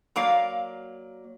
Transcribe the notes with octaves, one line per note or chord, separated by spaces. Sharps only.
F#3 A#3 D5 F5